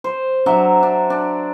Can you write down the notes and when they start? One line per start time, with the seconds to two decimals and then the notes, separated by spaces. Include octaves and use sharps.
0.04 C5
0.46 F#3 D4 E5 A#5
0.83 D4
1.10 D4